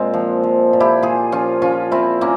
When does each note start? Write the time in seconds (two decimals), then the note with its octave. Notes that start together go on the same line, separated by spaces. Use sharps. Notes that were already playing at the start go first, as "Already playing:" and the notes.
Already playing: A#2 G#3 C4
0.14 F3
0.43 F3
0.73 A#2
0.80 E4 G4
1.02 A#2 F4 G#4
1.32 F3 C#4 F4
1.62 F3 C#4 F4
1.92 A#2 C4 E4
2.21 A#2 A#3 C#4